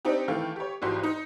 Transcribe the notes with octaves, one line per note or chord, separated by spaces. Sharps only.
C4 D4 D#4 G4
D#3 E3 A3 F5 G5
G4 C#5
G#1 F2 E3 F#4 G4 C6
D#4